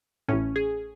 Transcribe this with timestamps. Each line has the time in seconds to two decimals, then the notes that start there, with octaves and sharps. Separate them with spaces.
0.28 A1 A2 C#4
0.56 G#4